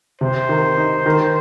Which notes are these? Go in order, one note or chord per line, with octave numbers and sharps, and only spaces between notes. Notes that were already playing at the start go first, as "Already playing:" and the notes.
C3 C5
D#3
D#4
D#3